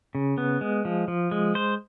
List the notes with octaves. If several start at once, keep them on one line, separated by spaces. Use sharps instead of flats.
C#3
B3
G#3
F3
F3
G#3
C5